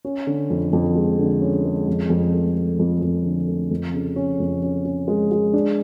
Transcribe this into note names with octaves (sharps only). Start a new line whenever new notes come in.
C#4
D3
F2
F2
G#3
D3
C#4
G#3
F2
F2
A3
A3
F2
F2
D3
A3
F2
C#3
C#4
F2
C#4
C#4
G#3
G#3
D4